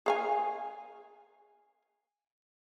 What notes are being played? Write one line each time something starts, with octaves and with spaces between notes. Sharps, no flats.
G#4 F5 G#5